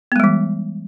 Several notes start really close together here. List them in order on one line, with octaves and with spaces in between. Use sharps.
B3 G#3 G3 E3